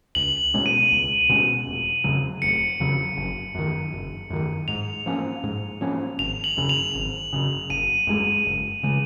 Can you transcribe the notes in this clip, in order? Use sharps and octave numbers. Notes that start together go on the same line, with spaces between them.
C#2 F#7
B2 G#3 C#4
D#7
C#2
B2 G#3 C#4
F1
F2 C#3 F#3
F1 C#7
F2 C#3 F#3
F#1
F#2 D#3
F#1
F#2 D#3
G#2 F7
F3 A#3 C#4
G#2
F3 A#3 C#4
G#1 F7
F#7
F#2 C#3
F7
G#1
F#2 C#3
F#1 D#7
F#2 C#3 G#3
F#1
C#3 G#3